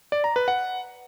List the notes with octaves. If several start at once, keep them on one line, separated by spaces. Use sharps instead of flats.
D5
A#5
B4
F#5